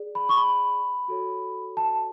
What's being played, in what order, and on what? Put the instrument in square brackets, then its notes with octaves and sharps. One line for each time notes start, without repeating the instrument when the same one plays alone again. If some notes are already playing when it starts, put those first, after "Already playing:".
Already playing: [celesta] G#4 D5
B5
C#6
B5
F#4 A4 C#5
A5